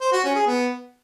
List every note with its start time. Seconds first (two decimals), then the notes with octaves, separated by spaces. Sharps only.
0.01 C5
0.12 F#4
0.24 C#4
0.35 G#4
0.46 B3